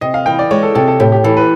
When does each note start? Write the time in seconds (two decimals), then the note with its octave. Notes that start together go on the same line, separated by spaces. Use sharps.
0.01 C3 D#5
0.14 F5
0.26 E3 G5
0.39 D5
0.51 G#3 C#5
0.63 A4
0.75 C3 A4
0.88 A4
1.00 A2 G4
1.12 G4
1.24 E3 A4
1.37 B4